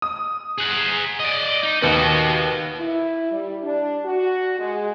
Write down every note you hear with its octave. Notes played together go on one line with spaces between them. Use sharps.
D#6
G#4 F#5
D5 D#5
D#4
D#2 B3 F#4 D#5
E4
G3
D4
F#4
G#3